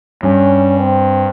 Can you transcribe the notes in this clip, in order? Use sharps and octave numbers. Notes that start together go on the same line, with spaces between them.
G2 C#4
C4